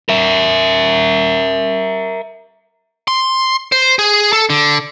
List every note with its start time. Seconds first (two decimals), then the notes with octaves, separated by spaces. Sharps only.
0.09 A#4 E5
3.08 C6
3.72 C5
3.99 G#4
4.33 A4
4.50 D3